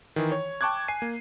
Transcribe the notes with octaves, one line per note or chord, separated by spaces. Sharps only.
D#3 E3
C#5
G5 A5 C#6 D6 F#6 G#6
G#5 C7 D#7
A#3